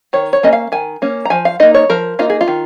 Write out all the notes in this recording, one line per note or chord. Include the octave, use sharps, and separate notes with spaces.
D#3 C#5
C#5
A#3 C#4 D#5
F5
D#3 G#5
A#3 C#4
A#5
F3 G#5
F5
A#3 D#4 D#5
C#5
F3 A#4
A#3 D#4 F4
G#4
F4
D#3